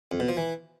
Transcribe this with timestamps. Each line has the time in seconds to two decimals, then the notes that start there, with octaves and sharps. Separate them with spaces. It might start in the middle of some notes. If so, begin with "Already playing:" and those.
0.12 F2
0.20 B2
0.29 F3
0.37 E3